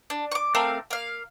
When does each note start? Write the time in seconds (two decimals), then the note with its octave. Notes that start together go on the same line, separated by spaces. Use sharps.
0.10 D4
0.32 C#6 D6
0.55 A3 C4 A#4 F5
0.91 A#3 F5